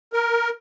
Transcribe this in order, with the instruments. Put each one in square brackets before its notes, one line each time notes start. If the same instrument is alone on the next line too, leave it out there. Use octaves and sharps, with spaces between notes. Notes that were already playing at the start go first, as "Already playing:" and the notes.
[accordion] A#4